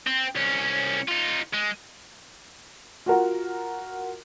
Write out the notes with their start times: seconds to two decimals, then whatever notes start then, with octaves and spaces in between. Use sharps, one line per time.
0.07 C4
0.35 C2 C#4
1.08 D#4 F4
1.54 G#3
3.06 F4 F#4 A#4 F#5